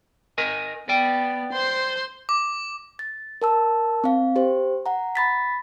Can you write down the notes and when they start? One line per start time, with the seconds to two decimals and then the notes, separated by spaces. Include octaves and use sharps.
0.38 A#4 D#5 G#5
0.89 B3 D5 G5
1.53 C5 C6
2.29 D6
2.99 A6
3.42 A#4 A5 E6
4.04 C4 F5
4.36 G4 C5
4.86 F#5 A#5
5.15 B5 A6 B6